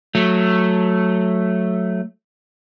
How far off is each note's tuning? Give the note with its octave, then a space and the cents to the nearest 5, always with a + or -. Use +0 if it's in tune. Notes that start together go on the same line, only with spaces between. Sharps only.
F#3 -10 A3 +0